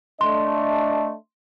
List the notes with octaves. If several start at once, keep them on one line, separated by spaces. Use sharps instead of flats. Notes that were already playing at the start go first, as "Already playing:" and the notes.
A3 D4 D#5 C6